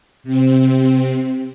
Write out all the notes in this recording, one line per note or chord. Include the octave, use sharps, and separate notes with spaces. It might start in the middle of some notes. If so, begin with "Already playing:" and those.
C3 C4